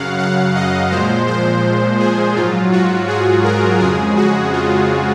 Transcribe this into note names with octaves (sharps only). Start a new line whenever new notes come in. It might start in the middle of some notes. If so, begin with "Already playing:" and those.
Already playing: F#2 C#3 F#3 F5 F#5
F#5
D#5
A#2 F3 G#3 C5
C5
G#4
G#2 F#3 F4
F#4
G#4
A#4
F2 C#3 G#3 G#4
F#4
F4